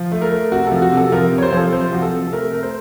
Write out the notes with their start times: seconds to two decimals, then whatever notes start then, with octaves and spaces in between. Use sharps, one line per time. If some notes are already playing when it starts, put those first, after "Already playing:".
Already playing: F3
0.12 A3
0.22 A#4
0.32 A3
0.52 C3 F#4
0.67 F3 A4
0.82 F#4
0.92 C3
0.97 A4
1.12 F3 A#4
1.32 C3
1.38 C#5
1.42 C5
1.53 F3 A4
1.73 C3 C5
1.93 F3 F#4
2.02 A4
2.12 C3
2.28 A4
2.33 A3 A#4
2.52 A3 A#4
2.63 C5